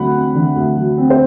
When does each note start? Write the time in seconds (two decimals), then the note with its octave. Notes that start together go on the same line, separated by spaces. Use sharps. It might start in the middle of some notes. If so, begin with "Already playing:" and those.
Already playing: D2 D3 F#3 C4 F#5 B5
0.13 C4
0.35 D3
0.56 D2
0.77 F#3
0.98 C4
1.10 C5